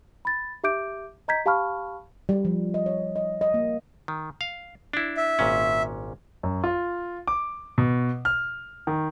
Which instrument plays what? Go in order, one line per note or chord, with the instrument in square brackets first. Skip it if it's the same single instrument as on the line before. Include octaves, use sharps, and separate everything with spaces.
[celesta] B5 A6
G4 E5 D6 G6 D7
D#5 A#5 G6 G#6 B6
G4 F5 A5 B5 C#6 F6
[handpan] G3
F3
D#5
C#5
D#5
D#5
A#3
[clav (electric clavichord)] D#3
F5
D4 E4
[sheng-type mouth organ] E5
[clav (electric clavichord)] G#1 A#2 C#4
[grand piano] F#2
F4
D6
B2
F6
D#3